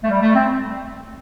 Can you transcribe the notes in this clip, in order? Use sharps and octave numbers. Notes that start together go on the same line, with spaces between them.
A3
G3
A3
C4